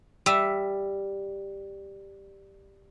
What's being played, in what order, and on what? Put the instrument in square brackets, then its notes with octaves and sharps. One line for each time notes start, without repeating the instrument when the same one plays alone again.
[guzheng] G3 E5